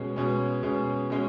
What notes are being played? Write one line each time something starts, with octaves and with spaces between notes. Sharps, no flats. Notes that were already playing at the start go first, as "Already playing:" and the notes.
Already playing: B2 G#3 C#4
B2 G#3 C#4
B2 G#3 C#4
B2 G#3 C#4